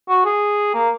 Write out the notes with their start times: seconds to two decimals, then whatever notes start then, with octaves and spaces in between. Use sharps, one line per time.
0.09 F#4
0.25 G#4
0.74 A#3